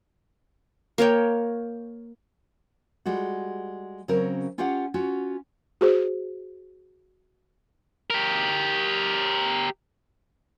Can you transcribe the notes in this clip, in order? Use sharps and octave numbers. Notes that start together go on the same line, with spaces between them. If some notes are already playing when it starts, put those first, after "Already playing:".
A#3 A#4 C#5 G5
G3 G#3 F4 F#4
C#3 F#3 C4 C#4 A#4
C#4 F4 G4 C#5 F5 F#5
C#4 F4 F#4
F#4 G#4 C5
G4 A#4